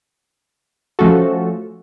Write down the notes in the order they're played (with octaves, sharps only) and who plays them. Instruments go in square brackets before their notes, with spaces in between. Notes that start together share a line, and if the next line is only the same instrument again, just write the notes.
[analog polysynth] F3 A3 C#4 F#4 A4